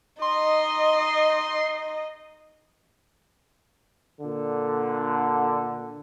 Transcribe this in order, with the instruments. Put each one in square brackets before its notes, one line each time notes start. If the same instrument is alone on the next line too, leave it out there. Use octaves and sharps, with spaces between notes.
[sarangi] D#4 [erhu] D#5 [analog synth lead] C6
[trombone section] A#2 D3